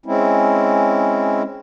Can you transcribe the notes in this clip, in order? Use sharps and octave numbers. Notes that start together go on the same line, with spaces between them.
G#3 C4 C#4 E4